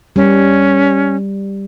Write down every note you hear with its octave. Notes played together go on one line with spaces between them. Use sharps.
G3 C#4